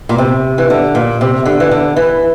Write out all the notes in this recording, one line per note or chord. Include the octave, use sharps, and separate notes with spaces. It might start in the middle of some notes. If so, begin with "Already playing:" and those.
A#2
C3
E3
D3
A#2
C3
D3
E3
D3
E3